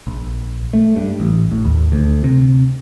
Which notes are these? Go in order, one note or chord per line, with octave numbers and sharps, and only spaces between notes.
A#1
A3
G2
A1
A2
D#2
D2
C3